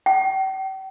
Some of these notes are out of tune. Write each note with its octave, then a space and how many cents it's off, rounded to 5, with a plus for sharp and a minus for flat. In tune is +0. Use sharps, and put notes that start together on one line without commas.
G5 -40